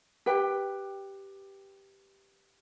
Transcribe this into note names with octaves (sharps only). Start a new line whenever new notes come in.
G4 B4 G5